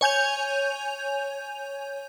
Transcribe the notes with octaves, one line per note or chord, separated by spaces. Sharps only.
C#5 G#5 G6 F7